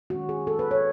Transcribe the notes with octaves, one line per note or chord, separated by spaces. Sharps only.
D#3 G#3 C#4 F#4
G#4
A4
B4
C#5